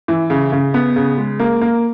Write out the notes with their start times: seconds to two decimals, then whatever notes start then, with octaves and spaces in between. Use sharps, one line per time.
0.08 E3
0.30 C#3
0.52 C#3
0.74 B3
0.96 C#3
1.18 G#3
1.39 A#3
1.61 A#3